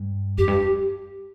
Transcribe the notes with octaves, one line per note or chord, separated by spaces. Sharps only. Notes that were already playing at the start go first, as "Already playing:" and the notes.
Already playing: G2
F2 G4
G2